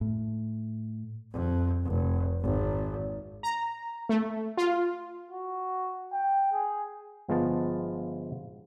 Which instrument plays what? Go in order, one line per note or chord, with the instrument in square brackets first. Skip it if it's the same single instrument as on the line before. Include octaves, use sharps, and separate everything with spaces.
[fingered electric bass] A2
[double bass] F2
F1
G#1
[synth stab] A#5
A3
F4
[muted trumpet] F#4
G5
G#4
[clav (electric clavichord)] G1 F3 G#3 B3 F4 A5